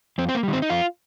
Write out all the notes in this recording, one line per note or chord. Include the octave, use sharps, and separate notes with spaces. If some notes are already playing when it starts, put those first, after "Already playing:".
F2 C4
C4
A#3
D#3 G3
C4
D#4
F2 F4